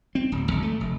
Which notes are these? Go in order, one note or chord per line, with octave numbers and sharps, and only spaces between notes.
C4
D1
G#1
A3
F1